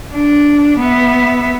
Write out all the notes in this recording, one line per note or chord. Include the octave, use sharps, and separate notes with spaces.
D4
B3 E5